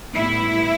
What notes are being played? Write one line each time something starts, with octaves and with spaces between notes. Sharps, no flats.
A2 G3 B3 E4